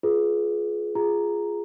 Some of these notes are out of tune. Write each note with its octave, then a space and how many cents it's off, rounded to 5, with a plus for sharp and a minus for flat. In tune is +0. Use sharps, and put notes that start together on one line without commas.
F4 +0 G#4 +25 B4 +0
F4 -5 G#4 +5 A#5 +0